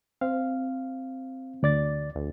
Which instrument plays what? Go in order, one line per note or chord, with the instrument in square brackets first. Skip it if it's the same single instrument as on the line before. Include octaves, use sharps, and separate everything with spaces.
[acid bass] C4 [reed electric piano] F5
[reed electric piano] D2 D5 A6
[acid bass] D2